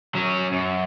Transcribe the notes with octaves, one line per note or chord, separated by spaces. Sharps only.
F#3 C#4
F#2